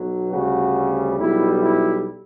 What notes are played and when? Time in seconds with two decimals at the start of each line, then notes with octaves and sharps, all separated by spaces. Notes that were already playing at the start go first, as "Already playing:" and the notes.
Already playing: B1 B2 F#3
0.32 D2 C#3 G3 F#4
1.18 B1 B2 G3 E4
1.61 E4